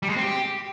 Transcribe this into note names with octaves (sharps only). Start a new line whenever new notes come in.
G3
G#3
C4
G4